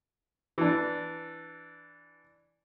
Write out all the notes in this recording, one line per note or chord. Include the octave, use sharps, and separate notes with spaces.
E3 D4